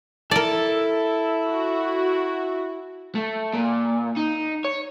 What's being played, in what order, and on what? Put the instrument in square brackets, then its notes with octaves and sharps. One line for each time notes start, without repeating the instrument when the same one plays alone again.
[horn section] E4 [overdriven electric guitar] A4 [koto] A#4 D5
[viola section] F#4
[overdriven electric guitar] A3
A#2
D#4
C#5